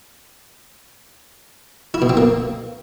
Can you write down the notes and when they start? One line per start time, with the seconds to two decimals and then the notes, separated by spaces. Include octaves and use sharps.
1.94 E4
2.02 B2
2.09 C4
2.17 A#3